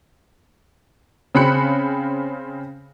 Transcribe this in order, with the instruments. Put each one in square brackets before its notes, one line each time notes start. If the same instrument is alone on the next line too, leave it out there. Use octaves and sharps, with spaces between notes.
[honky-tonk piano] C#3 C4 B5 F#6 C#7